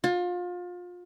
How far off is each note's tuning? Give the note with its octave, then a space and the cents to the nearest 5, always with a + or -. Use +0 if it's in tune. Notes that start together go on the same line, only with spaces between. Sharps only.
F4 +30